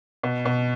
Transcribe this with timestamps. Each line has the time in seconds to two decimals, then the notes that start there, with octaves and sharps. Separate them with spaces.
0.23 B2
0.45 B2